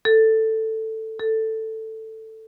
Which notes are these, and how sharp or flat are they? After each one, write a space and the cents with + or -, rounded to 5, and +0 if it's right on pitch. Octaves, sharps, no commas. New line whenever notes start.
A4 +10
A4 +10